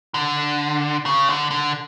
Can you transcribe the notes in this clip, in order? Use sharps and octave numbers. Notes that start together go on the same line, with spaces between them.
D3
C#3
D3
D3